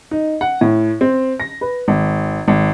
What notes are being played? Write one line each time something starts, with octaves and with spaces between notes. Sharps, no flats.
D#4
F#5
A2
C4
A#6
B4
G#1
G#1